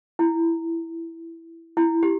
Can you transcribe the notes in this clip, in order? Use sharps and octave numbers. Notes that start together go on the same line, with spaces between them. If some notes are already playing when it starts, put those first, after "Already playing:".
E4
E4
G4